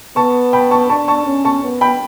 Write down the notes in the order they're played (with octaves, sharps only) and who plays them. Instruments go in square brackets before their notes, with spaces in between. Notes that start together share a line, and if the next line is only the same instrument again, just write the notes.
[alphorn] B3 [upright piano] A5 C#6
[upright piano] G5 B5
A5 C#6
[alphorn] D4 [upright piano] A5 C#6
[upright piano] A5 C#6
[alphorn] C#4
[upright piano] A5 C#6
[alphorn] B3
[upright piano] G5 B5